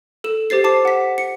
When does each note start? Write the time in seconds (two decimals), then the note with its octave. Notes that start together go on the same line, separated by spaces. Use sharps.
0.24 A4 E7
0.50 G4 C5 A6 C7
0.64 A5 D6 C7
0.85 F#5 B6
1.18 C#7